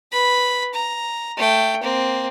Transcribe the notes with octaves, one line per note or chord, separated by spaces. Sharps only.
B4 B5
A#5
A3 G5
A#3 C4